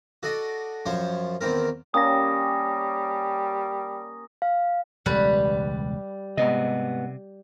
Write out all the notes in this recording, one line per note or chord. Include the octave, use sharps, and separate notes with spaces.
F#4 A4 D5 D#5
F#2 F3 C5 C#5
E2 D#3 C4 A#4
G3 A#3 C#4 G4 D#6 A#6
F5
E1 C#2 G3 B4
G#2 C3 B3 D#5